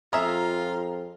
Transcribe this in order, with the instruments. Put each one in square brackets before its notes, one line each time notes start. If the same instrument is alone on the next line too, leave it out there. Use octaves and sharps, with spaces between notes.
[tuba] F2 [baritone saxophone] F4 [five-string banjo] G#4 E5 [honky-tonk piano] A#5